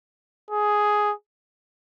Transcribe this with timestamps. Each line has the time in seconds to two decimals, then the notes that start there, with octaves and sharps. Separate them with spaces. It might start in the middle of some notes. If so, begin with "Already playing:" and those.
0.51 G#4